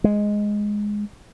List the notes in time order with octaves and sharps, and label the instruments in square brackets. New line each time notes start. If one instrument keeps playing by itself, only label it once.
[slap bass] G#3